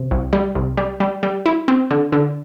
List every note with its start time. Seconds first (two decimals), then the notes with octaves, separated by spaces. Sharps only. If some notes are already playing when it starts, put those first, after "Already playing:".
Already playing: C3
0.11 C2
0.33 G3
0.55 C2
0.77 G3
1.00 G3
1.23 G3
1.46 E4
1.68 C4
1.91 D3
2.12 D3